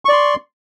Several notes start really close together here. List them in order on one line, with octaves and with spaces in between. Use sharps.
C#6 D5 C6